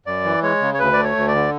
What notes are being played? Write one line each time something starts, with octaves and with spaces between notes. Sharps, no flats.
F#2 D5
E3
G#3 C#5
C#3
C#5
D2 B4
A3 D5
C#5
D2
D5
D3